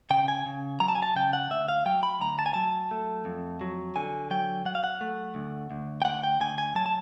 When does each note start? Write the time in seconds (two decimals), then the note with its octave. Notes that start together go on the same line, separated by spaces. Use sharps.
0.10 C#3 G5
0.28 G#5
0.46 C#3
0.80 F#3 A#5
0.88 A5
0.95 G#5
1.03 A5
1.16 C#3 G5
1.33 F#5
1.50 D2 E5
1.68 F5
1.86 F#3 G5
2.03 B5
2.21 D2 A#5
2.39 A5
2.46 G#5
2.54 F#3 A5
2.91 A3
3.25 F2
3.61 F#3
3.96 D3 G#5
4.31 F#3 G5
4.65 F#3 F#5
4.75 F5
4.84 F#5
5.01 A3
5.35 D2
5.71 D2
6.02 G5
6.05 D2 F#5
6.23 G5
6.40 D2 G#5
6.58 G#5
6.75 F#3 A5
6.86 A5